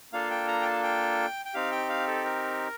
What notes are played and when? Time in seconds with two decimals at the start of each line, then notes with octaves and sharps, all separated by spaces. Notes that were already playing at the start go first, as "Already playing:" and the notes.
0.12 A#3 D4 F4 A4 F5
0.30 G5
0.48 A#5
0.62 G5
0.66 A5
0.83 G5
1.46 G5
1.54 C4 D#4 G4 F5
1.72 G5
1.89 F5
2.07 A4
2.25 A#4